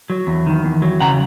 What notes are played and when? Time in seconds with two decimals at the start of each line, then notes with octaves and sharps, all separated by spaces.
0.10 F#3
0.27 E2
0.46 D#3
0.65 E2
0.82 F#3
1.00 C#3 F#5 A#5